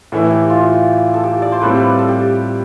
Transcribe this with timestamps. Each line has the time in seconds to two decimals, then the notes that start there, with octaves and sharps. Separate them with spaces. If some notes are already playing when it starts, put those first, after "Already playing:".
0.12 A2 E3 A3 E4
0.30 G4
0.50 F4
1.14 A4
1.23 G4
1.42 D5
1.52 C5
1.61 A2 G3 C4 B4
1.80 B4
1.99 A4
2.09 G4